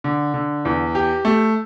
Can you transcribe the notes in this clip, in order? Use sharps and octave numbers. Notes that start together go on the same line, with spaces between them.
D3
D3
E2
G4
A3